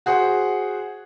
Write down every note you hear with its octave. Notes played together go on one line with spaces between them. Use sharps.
F#4 G#4 C5 F#5